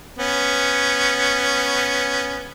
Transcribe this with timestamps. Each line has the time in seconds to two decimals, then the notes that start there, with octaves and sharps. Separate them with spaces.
0.19 B3 C#4